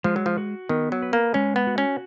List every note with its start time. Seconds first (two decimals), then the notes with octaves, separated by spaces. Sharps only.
0.04 F3 G#3
0.16 F#3
0.26 F3
0.38 F#4
0.69 D#3 B3
0.92 F#3
1.02 B4
1.13 A#3
1.34 G#3 C#4
1.56 B3
1.67 F#4
1.78 C#4